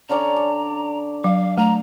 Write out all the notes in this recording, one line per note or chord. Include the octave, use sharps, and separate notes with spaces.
D3 C#4 D5 A#5
D5
F#3 F5
A3 A#5